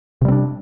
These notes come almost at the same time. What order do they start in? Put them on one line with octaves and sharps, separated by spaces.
C3 G3 C4 D4